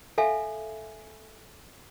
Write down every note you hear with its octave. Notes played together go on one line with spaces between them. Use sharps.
A4 E5 F5 G#5